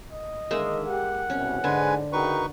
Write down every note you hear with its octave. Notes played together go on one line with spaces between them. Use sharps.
D#5
D3 D#3 G#3 A#3 E5
G4 F#5
C2 F#2 B2 C#4
G#2 D3 G#3 B4 G#5
C#3 D#4 F#4 A#4 B4 G5 C#6